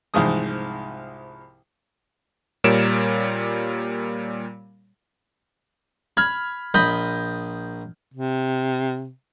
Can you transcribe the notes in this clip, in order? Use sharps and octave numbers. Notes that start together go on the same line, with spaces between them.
C2 G#2 F3 G#3 D#6
A#2 G3 A#4 C#5 D7 E7
B5 F6 G#6
A#1 D#5 B5 G6
C3